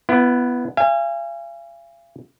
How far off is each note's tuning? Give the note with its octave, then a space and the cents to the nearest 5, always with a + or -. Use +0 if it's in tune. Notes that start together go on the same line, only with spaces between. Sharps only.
B3 +0 E4 +35
F5 -45 G#5 -25